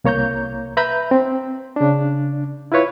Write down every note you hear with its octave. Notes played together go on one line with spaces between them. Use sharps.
C2 A#3 C#5 A#5 G6
B4 E5 A#5 B5 G6
C4
C#3 D4
E4 F4 B4 C#5